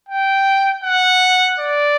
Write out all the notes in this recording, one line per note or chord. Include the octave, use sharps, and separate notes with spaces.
G5
F#5
D5